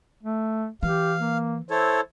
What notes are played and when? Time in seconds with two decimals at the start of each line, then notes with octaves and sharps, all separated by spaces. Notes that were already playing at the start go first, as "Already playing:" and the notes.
0.23 A3
0.83 E3 G4 F5
1.21 A#3
1.71 E4 A4 C5 C#5